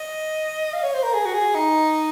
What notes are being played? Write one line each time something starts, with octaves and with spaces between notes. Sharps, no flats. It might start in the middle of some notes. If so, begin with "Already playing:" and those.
Already playing: D#5
F5
C#5
C5
A#4
G#4
F#4
G#4
D#4